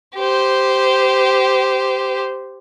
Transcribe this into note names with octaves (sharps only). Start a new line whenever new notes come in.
G4 C5